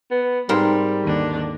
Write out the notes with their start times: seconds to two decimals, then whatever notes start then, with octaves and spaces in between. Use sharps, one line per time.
0.11 B3
0.49 G#2 G3 C4 A#4
1.03 D#2 D3 D4